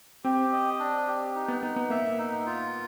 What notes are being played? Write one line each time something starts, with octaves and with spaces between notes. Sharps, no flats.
C4 G4
D#5
D4
G4
D#4
B3
B3 D#4
B3
A#3 E5
D#4
F4